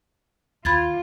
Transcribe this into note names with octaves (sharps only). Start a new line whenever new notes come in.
D#2 F4 B5 G#6 A6